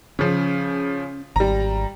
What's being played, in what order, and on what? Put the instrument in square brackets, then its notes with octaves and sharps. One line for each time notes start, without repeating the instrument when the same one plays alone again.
[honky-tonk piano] C#3 F3 [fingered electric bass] C#4
[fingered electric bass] G#1 [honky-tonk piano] G3 A#5